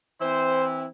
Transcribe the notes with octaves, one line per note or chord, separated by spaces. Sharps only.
E3 C4 E4 C5